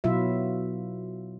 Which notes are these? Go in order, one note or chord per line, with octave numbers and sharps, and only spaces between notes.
B2 F#3 E4 F4 E5